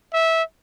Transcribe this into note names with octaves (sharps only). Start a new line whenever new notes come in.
E5